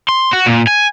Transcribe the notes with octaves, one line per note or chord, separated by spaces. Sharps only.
C6
F#4
A#2
G#5